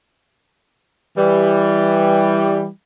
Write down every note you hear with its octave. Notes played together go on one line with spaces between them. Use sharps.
E3 G3